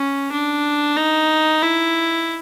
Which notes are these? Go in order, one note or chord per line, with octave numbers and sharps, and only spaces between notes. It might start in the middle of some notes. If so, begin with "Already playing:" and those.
Already playing: C#4
D4
D#4
E4